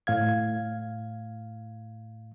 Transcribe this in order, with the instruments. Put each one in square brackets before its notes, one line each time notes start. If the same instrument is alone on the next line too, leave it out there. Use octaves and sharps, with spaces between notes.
[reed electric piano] A2 F5 G#6